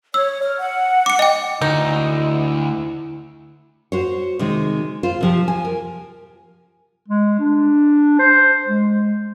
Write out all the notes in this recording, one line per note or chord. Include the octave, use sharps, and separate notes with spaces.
C#5 E6
F6
F#5
D6 C#7
D#5 G5
D2 D#4 E4
F#4 C5 C#5
C3 D#3 G#3
F4 C5
C3 F3 G4
G#5
A#4
G#3
D4
C5
G#3